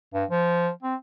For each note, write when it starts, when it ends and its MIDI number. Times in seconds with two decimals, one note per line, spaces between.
0.14 0.24 43
0.31 0.70 53
0.83 0.95 60